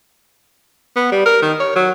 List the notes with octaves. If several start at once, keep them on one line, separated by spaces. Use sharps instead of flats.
B3
G3
A#4
D#3
C#5
F#3